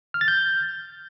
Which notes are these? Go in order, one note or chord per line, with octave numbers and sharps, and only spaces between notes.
F6
A6
G6